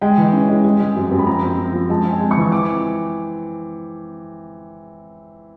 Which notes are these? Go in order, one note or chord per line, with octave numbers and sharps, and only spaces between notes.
G#3 G5
E3
C#4
G#3
G#3
G#3
F#2
F#2
B5
F3 A#5
C4
F3
F3
G#3 A5
C4
G#5
G#3
C#6
E3
C4 D6